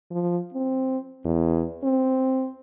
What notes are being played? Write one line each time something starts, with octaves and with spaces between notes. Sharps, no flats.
F3
C4
E2
C4